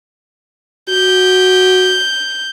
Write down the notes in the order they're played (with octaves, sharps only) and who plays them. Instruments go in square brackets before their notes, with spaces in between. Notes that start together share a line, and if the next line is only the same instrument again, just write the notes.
[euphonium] F#4 [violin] G6